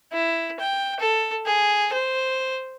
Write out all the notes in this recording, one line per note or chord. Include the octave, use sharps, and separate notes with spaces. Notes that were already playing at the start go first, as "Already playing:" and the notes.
E4
G5
A4
G#4
C5